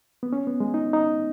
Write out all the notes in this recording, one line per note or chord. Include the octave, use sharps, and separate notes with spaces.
B3
C#4
B3
G#3
D#4
D#4